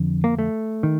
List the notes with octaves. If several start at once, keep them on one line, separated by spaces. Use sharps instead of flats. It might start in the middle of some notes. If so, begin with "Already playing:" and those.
Already playing: F2 D3 F3
A#3
A3
D#3